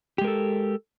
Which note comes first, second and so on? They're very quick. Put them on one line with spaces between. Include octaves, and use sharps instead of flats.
G4 G#3 A#4 A4